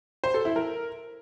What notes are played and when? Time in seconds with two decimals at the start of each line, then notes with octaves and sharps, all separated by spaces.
0.24 C5
0.34 A4
0.45 E4
0.56 A#4